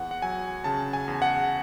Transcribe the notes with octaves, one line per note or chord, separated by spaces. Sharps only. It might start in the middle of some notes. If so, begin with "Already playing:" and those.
Already playing: E2 F#5
F#5
F#3 G#5
C#3 A5
G#5
E2
F#5